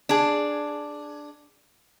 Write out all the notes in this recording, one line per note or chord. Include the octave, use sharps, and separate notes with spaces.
D4 G#4